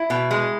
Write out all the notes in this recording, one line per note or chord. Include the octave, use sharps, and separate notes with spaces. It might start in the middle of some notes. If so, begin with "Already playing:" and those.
Already playing: E4
B2
G#3